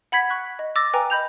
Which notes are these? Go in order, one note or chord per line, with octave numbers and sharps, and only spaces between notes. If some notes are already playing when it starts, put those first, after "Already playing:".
F#5 B5 G#6 B6
C#6 F#6
D#5
D6 E6 A6 A#6
B4 G5 G#5 A#5
D#5 B5 G6 F7